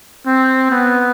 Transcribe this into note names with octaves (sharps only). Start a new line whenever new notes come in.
C4
B3